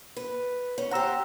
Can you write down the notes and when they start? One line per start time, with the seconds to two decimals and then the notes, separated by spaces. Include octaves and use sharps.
0.16 B4
0.78 C#4
0.91 G4 C5 F#5 A#5 E6